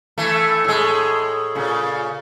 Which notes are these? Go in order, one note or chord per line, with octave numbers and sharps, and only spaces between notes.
E3 A3
A2 G#3
A#2 C#3